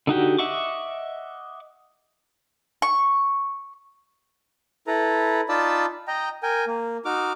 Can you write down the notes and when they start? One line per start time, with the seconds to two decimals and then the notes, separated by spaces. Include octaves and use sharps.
0.07 D3 D#4 F#4 G4
0.38 D#5 E5 F#5 C#6 D6
2.82 C#6
4.87 E4 A4 B4 A#5
5.49 D#4 F4 D5 A5 B5 E6
6.08 D#5 G5 A#5
6.43 A#4 G5 G#5
6.67 A#3
7.05 D#4 F#4 D6 F6